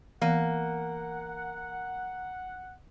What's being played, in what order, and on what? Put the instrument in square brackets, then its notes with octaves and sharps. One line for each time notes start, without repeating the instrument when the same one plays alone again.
[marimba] E3 B3 [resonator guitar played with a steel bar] A#3 [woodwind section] F#5